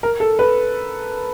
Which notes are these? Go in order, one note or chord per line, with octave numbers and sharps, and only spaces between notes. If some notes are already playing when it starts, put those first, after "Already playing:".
A#4
A4
B4